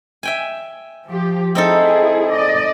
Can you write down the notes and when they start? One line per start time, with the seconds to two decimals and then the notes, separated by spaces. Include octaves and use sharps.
0.23 E5 G5 G#5
1.08 F3 G4
1.55 C4 D#4 E4 G#4 A4
2.32 D5 D#5